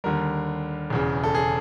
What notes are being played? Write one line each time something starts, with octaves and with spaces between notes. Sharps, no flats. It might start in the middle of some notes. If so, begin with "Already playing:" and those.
D#2 D3 G3 A#4
E1 E2 C#3
A4
G#4